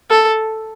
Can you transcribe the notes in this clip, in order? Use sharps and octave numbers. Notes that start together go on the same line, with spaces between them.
A4